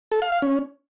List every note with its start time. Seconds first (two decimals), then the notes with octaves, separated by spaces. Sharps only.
0.12 A4
0.22 F5
0.32 F5
0.42 C#4